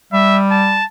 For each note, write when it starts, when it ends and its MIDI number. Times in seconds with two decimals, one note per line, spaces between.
0.13 0.83 55
0.13 0.39 76
0.51 0.85 81